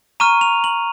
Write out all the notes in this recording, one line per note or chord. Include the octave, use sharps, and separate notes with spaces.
A#5 C#6 F6 D#7
F7
F#7